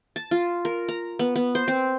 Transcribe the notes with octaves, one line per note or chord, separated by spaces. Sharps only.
A5
F4
A#4
A#5
B3
B3
C5
C4